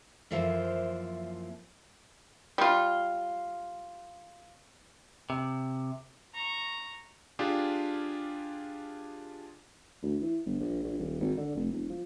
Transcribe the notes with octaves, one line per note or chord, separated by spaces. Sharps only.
F#2 E3 F3 A#3 C5 E5
G3 F4
C3
A#5 C#6
D4 F4 G4 G#4
D2
E3
G1
A#1
A#1
D#1
G#1
D3
F1
E1
F3